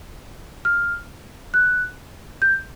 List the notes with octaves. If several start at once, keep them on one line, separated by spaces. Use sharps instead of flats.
F6
F#6
G6